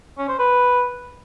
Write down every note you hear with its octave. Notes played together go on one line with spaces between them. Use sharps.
C#4
C5
B4